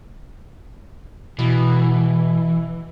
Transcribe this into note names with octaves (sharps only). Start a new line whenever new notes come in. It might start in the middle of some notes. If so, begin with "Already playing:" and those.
B2 E3